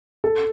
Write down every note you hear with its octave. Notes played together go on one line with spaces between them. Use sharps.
A4